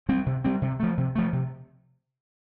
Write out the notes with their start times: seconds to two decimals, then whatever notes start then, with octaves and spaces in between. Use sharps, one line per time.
0.09 G3 C4
0.26 C3
0.44 G3 C4
0.62 C3
0.80 F3 A3
0.98 C3
1.15 F3 A3
1.33 C3